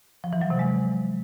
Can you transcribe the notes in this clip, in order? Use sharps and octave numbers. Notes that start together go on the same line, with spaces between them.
F3
E3
F#3
C3
G#3